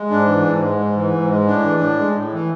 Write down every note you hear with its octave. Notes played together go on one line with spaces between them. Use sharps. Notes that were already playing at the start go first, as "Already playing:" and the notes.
Already playing: G#3
G#2 D4
E3
G#2
G#3
G#2
E3
G#2
G#3
A2 D4
E3
A2
G#3
A2
E3